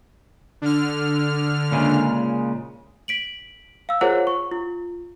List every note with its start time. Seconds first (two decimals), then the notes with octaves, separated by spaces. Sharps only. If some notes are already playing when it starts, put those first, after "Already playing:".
0.62 D3 F6
1.72 A#2 C#3 G#3
3.08 B6 D7 F#7
3.89 F5 E6
4.01 F4 G#4 A#4 C5 C#5 F#5
4.27 C#6
4.52 F4